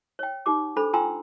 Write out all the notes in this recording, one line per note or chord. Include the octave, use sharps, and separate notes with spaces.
C#5 G5
D#4 G4 D6
D4 A4 C5 B5
F4 G5 G#5 A#5 C6 E6